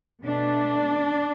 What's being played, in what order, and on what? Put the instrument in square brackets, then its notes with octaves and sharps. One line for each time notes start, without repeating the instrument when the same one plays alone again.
[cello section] B2 A3 D4